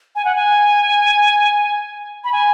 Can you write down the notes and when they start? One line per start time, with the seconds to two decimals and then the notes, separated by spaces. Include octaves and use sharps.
0.15 G#5
0.25 F#5
0.35 G#5
2.24 B5
2.33 G#5